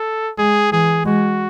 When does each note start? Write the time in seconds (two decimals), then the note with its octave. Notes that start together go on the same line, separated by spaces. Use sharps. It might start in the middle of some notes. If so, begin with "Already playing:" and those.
Already playing: A4
0.38 G#3 G#4
0.72 E3 G#4
1.05 G#3 F#4